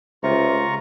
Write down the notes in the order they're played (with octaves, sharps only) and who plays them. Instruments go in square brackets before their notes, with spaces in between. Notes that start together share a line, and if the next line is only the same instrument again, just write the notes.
[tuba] C#2 [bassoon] C3 [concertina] F4 A#5 C#6